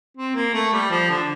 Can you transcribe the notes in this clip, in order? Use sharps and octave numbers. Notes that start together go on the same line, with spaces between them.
C4
A#3
A3
G3
F3
D3